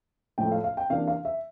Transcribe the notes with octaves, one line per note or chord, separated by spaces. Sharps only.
A2 F3 A3 G5
F5
F5
G5
C3 E3 A#3 D4 F5
F5
E5